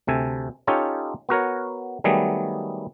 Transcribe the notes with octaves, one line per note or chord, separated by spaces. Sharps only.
D2 C3 A4 G#5
C#4 D#4 F4 G4 A4 C#5
B3 F#4 A#4 C#5
D#3 F#3 G3 A3 B3 G#4